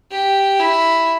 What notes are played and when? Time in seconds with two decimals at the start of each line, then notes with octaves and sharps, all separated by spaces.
0.11 G4
0.60 E4